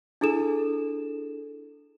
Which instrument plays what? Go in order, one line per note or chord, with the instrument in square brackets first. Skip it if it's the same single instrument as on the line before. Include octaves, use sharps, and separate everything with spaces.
[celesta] D4 E4 G#4 A4 E7